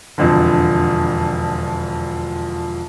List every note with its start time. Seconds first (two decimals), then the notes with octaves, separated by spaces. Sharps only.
0.18 E1 F2 D3